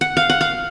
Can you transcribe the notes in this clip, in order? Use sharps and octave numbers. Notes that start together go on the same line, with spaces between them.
F#5
F5
F#5
F5